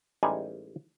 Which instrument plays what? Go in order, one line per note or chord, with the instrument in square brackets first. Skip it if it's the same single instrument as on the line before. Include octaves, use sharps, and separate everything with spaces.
[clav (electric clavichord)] A1 G3 G#3 D#4 G#5